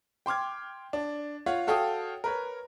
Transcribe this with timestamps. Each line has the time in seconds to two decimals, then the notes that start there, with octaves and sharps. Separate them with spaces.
0.26 G5 C6 D6 F6 G#6
0.93 D4
1.46 F4 C#5 F5 F#5
1.67 F#4 A4 C#5 F5 G5 D#6
2.24 A#4 B4 C#5